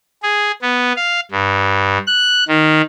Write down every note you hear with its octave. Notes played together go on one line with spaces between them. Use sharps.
G#4
B3
F5
G2
F#6
D#3